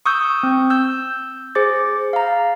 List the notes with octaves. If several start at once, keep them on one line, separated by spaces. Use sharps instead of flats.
C#6 D#6 E6 G6
C4
E6 G6
G#4 C5 D6 A6
F5 A#5